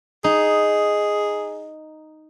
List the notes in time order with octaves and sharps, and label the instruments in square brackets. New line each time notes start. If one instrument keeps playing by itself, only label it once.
[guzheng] D#4 [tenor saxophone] G#4